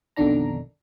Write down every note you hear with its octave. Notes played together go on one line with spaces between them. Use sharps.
B1 F2 D3 D#3 D4 A#5